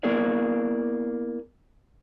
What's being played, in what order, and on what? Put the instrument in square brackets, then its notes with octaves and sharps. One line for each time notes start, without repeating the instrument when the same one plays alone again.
[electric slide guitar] A#3 B3 E4 G#4 A#4 D5